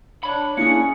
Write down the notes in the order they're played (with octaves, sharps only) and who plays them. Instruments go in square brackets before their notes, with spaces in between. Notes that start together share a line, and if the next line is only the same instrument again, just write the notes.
[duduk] D4 [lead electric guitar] C#5 B5 [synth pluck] C#7
[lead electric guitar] A#3 G#4 [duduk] C#4 [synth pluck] D4 E4 F#6 [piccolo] C#7